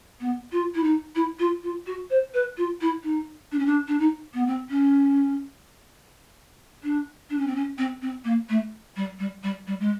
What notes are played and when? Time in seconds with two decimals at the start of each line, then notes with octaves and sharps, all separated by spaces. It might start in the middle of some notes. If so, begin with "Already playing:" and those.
0.20 B3
0.51 F4
0.74 E4
0.83 D#4
1.15 E4
1.39 F4
1.63 F4
1.86 F#4
2.10 C5
2.34 B4
2.57 F4
2.81 E4
3.03 D#4
3.52 D4
3.59 C#4
3.66 D4
3.88 D4
3.99 D#4
4.34 B3
4.47 C4
4.70 C#4
6.83 D4
7.30 D4
7.38 C#4
7.47 C4
7.55 C#4
7.78 C4
8.02 C4
8.24 A#3
8.49 A3
8.96 G3
9.19 G3
9.43 G3
9.67 G3
9.80 G#3